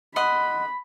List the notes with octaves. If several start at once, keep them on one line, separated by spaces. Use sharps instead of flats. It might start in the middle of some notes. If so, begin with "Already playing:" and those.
D#5 F#5 B5 C6